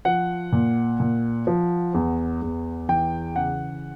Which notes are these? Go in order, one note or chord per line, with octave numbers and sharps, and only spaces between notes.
F3 F#5
A#2
A#2
F3
E2
E2
E3 G5
C#3 F#5